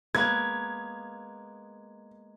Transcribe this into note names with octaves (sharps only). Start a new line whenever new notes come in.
G#3 A#3 B3 G#6